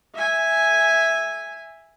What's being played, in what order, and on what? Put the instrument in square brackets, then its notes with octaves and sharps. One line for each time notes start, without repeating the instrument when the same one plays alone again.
[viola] E5 G#5